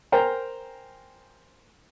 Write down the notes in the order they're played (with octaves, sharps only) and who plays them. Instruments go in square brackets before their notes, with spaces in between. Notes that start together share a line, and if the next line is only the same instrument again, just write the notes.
[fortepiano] A#4 C5 G5 G#5 A#5